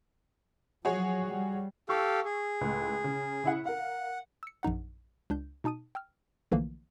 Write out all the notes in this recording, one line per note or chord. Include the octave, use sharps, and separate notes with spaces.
F3 F#3 F#4 G#4 C#5
G3
G4 A4 F5 C#6 E6
G#4
C#2 A2
C#3
C#3 E4 F#5
A#4 F5 F#5
E6 C#7
A#1 F#2 D#4 F#5
C#2 D4 G6
B2 D#4 A5 D#6 D#7
G5 E6 F6
B1 D3 E3 F3 A3 A#3